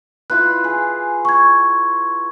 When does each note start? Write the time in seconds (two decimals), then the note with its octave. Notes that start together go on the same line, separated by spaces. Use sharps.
0.30 E4 F4 B4 F#6
0.64 G#4
1.25 C#6 G#6